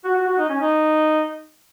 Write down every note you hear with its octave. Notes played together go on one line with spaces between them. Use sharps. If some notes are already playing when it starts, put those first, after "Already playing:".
F#4
F#4
F#4
D#4
C#4
D#4